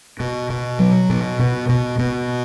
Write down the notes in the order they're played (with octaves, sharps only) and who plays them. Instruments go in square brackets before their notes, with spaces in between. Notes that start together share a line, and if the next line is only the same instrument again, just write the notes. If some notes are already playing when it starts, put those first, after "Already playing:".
[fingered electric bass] B2
B2
F#3
B2
B2
B2
B2